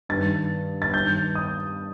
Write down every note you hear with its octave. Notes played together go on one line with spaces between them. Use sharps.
G2 D#3 A6
A6
G2 D#3 G6
D#6